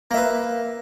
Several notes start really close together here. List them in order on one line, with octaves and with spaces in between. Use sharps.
A#3 E5 B4